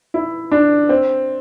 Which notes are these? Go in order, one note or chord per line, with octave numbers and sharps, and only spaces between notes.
E4
D4
C4